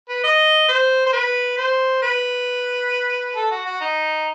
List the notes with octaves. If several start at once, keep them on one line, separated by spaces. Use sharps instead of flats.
B4
D#5
C5
C5
B4
C5
B4
A4
F#4
F#4
D#4